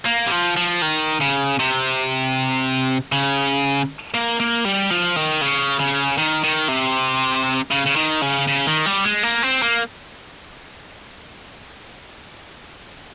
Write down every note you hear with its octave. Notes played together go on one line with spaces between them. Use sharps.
A#3
G3
F3
F3
D#3
C#3
C3
C#3
A#3
A#3
G3
F3
D#3
C#3
C#3
D#3
D#3
C3
C#3
C#3
D#3
C#3
C#3
D#3
G3
G#3
A#3
C4
A#3